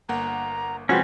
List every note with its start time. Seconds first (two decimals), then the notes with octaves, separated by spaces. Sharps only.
0.09 G1 A#3 F#5 A#5
0.89 C3 F3 G#3 C4 C#4 F4 F#4 B4